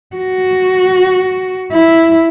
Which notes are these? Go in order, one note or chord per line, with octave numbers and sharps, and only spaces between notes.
F#4
E4